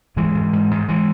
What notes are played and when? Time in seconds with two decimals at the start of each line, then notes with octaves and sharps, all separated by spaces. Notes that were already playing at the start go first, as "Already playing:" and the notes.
0.16 G#2 E3 G#3
0.35 G#2
0.53 G#2
0.71 G#2
0.89 E3 G#3